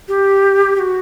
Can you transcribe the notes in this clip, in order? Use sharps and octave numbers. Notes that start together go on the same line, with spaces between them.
G4
G4
F#4